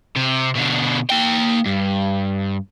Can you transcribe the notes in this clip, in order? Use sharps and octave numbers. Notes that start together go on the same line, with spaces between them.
C3
B2 D3
A#3 G5
G2